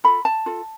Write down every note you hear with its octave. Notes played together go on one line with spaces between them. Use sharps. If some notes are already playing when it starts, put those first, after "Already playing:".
F4 A4 B5
A5
F4 A4